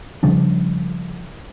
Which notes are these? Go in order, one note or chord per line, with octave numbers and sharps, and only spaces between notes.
C#3 F3 G3 D4